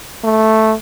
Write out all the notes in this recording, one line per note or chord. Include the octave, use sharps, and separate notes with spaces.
A3